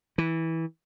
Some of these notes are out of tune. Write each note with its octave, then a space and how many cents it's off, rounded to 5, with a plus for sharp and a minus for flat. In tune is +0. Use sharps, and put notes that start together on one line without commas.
E3 -15